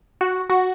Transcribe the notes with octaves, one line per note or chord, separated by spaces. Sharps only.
F#4
F#4